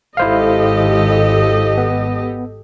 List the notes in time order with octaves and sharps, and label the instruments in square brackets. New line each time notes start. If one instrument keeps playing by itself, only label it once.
[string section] G#1 [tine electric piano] E4 C5 F5 [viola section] G4 A4 D#5
[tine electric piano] B3